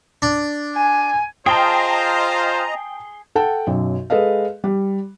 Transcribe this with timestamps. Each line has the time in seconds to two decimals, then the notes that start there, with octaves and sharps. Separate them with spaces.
0.22 D4
0.76 G#5
1.46 F4 G#4 C5 D#5 G5 A5 A#5 C6
3.35 A4 F#5 G5 A5
3.67 B1 F#2
4.10 G#3 G#4 A4 B4 D#5 F5
4.64 G3